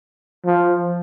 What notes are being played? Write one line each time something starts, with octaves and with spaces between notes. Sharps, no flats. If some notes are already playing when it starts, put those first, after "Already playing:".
F3